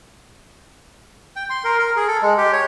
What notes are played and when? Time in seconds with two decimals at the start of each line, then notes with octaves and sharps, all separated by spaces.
1.36 G5
1.50 C6
1.64 A#4
1.79 A#4
1.96 G#4
2.08 A4
2.22 G#3
2.38 G4
2.53 C#5